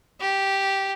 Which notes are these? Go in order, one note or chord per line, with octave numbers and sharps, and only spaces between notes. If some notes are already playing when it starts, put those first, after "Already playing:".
G4